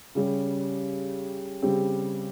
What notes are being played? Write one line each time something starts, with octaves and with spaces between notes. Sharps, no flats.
C#3 G3 C#4 G4
C#3 G3 C4 G4